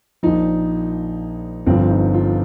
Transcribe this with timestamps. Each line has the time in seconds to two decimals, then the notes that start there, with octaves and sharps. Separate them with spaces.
0.23 A#1 A#2 F3 D#4
1.66 G1 G2 F3 C4
1.90 D#4
2.14 F4